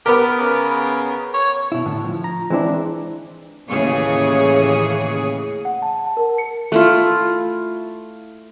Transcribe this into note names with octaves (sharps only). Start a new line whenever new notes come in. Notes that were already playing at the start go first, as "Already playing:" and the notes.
B3 G4 A#4
C#3
C#5
B2 E4
A2 D3
F3
A#5
E3 G#3 C4 D4 E4
D#2 A2 C#3 E3 G#4 C#5
F#5
A5
A5
A#4
C#7
A3 E4 F4